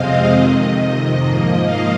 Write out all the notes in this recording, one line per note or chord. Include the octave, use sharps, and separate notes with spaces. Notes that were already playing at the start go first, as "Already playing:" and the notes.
Already playing: F2 C3 G#3 C4 D#5 F5
F2 C3 D#3
G#2 F3 A#3
F5